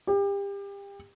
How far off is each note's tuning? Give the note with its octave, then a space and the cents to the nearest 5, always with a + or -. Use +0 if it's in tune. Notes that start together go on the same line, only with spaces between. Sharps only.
G4 +30